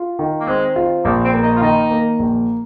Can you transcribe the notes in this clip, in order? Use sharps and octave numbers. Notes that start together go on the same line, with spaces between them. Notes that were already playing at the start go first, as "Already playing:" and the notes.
Already playing: F4
D#3
A#3
G#3 C4
F4
A#1 A#3
C4
A#3
D#4
F4
D#3 D#4
A#3
A#1